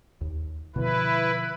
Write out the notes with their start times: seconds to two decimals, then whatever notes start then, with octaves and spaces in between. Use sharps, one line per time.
0.21 D#2
0.76 B2 D3 F3 E4 B4